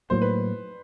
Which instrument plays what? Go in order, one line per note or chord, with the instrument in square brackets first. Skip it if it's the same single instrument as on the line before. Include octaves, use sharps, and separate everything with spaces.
[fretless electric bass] A2 F#3 A#3 [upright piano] C5
[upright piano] B4